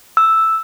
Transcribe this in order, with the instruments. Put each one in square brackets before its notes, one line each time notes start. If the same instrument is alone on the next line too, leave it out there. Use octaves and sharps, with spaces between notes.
[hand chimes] E6